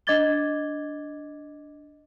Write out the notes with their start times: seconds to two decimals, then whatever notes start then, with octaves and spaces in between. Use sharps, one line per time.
0.07 D4 D#5 D6 G#6 A6 G7